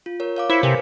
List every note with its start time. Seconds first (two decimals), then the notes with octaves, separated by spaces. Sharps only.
0.06 F4
0.20 A#4 C#5
0.36 C#5 F5 D6
0.50 E4 C5 B6 C#7
0.63 C3 A#4 B4 G#5